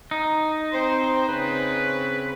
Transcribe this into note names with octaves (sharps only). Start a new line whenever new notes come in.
D#4
C4 C5
C#3 C4 B4